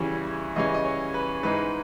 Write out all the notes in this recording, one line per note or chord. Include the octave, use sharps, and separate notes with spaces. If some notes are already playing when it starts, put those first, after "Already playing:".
Already playing: E2 C#3 E3 G3 C#4
E2 C#3 E3 G3 C#4 D#5
D#5
C#5
B4
G#2 E3 G#3 D#4 B4